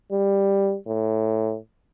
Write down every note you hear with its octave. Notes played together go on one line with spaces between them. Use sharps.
G3
A2